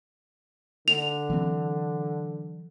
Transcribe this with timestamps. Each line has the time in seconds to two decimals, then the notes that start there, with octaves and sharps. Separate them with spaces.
0.88 D3 F7
1.30 E3 F#3 C4